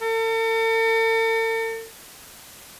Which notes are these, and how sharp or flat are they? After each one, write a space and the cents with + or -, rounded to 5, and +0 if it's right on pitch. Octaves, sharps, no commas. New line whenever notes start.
A4 +45